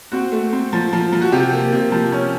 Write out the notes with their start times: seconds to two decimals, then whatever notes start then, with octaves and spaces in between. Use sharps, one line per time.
0.12 C4 F#4
0.32 A3
0.53 C4
0.73 F3
0.93 F3
1.12 F3
1.22 F#4
1.32 C3 G4
1.53 A#3
1.72 C3
1.92 F3
2.12 C#4